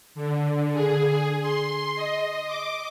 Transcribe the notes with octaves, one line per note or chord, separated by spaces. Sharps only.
D3
G#4
C6
D#5
D6